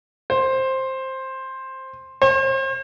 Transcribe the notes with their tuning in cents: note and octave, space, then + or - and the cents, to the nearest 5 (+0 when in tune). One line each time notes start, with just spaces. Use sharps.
C5 +10
C5 +40